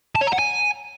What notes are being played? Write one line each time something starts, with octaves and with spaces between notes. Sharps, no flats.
A5
C#5
A#5
F#5
G#5